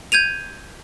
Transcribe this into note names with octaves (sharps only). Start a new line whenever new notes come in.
G6 G#6 D#7 F7